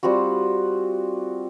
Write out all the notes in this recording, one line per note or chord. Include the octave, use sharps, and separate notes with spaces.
G3 C4 F4 F#4